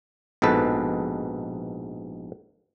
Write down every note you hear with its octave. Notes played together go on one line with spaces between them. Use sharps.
A#1 G#2 B2 A4 B4